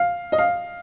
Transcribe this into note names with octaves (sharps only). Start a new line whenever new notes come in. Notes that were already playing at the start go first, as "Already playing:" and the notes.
Already playing: F5
D#5
F5